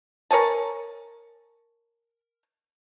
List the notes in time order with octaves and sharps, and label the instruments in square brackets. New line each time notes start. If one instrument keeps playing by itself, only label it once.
[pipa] A#4 C#5 G#5 A5